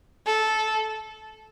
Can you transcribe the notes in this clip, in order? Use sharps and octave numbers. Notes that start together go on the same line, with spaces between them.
A4